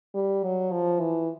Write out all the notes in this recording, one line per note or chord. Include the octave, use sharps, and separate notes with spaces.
G3
F#3
F3
E3